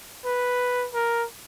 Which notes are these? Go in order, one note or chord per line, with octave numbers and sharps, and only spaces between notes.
B4
A#4